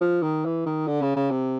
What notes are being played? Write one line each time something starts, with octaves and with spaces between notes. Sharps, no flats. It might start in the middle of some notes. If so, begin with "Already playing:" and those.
F3
D#3
E3
D#3
D3
C#3
C#3
C3